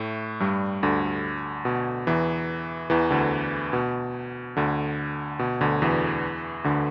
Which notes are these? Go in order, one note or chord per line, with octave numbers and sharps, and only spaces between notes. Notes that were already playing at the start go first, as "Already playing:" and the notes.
Already playing: A2 A3
G2 G3
D2 D3
B2
E2 E3
E2 E3
D2 D3
B2
D2 D3
B2
D2 D3
E2 E3
D2 D3